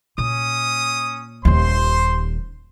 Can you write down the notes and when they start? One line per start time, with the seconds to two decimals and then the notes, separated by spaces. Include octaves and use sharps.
0.18 A#2 C#4 D#6
1.45 D#1 D#2 C5 C6